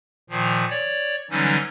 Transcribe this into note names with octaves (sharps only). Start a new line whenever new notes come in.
A#2 D#3 F3
C#5 D5
D3 E3 F#3 G3 C#4 D#4